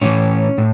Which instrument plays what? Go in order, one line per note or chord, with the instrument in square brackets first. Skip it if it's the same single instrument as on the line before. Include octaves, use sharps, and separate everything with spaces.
[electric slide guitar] A2 E3 C#4
A2